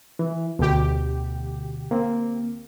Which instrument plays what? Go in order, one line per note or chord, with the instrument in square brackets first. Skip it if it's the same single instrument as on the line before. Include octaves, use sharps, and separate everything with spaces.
[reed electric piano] E3
[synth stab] D2 G4 [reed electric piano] B2
[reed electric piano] A#3 C4